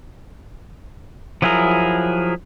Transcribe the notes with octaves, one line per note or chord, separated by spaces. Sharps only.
F3 F#3 E4 G#4 A#4